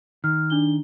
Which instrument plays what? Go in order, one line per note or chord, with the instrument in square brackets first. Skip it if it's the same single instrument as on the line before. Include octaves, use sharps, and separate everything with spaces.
[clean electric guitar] D#3 [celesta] F6
[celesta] D4 G7